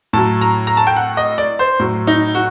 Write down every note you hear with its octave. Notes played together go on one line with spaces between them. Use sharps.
A2 F#3 A5
A#5
A#5
A5
G5
F#5
D#5
D5
C5
A2 F#3
D#4
F#4